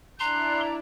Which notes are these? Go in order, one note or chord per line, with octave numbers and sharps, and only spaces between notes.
D4 E4 A#5 C6 F#6